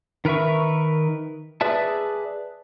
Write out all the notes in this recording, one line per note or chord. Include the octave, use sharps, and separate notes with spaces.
D#3 A#4 B4 E5 C#6
G#4 B4 D5 E5 A5